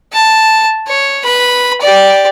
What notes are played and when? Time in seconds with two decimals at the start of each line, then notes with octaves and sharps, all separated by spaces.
0.13 A5
0.87 C#5
1.24 B4 B5
1.81 G4 D5